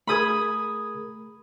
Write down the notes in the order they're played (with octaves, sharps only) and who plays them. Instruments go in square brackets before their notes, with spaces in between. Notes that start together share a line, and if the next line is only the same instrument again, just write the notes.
[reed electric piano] A3 G#4 A#4 [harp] B5 D#6 G#6